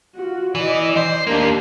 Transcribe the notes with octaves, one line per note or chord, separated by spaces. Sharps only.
F4 F#4
E3 D5 D#5
C5
D#2 A#3 D4 G4